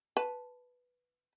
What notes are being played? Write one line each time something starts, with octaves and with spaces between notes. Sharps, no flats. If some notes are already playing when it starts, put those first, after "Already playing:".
B4 A5